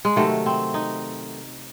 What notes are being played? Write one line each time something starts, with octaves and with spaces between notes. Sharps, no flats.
G#3
C3 D#3 F#3 A3
C4
D#4